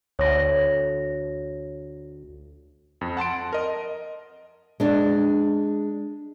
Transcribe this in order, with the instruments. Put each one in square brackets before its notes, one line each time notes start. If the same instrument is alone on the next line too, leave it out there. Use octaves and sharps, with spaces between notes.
[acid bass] D2 [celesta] C#5 A#6
[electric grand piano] F2
F#5 A5 C6 D7
A#4 D#5
[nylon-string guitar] G#3 D4